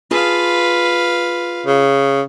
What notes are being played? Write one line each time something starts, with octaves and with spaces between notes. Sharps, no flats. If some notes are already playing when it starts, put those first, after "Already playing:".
F4 G#4 B4 F5 A5
C#3